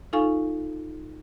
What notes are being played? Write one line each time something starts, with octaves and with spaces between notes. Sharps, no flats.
D#4 F4 A4 F5 G#5 C#6